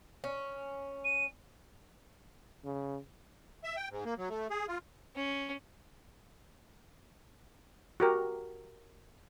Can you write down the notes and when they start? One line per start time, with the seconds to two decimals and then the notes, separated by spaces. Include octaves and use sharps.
0.24 C#4
1.05 D#7
2.64 C#3
3.64 E5
3.76 G5
3.91 G#2
4.05 A#3
4.18 F#3
4.30 A3
4.50 G#4
4.68 F4
5.15 C#4
8.00 F#4 G4 A#4